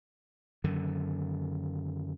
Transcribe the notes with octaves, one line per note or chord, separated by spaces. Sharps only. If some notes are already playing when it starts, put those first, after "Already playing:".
F#2 D3 D#3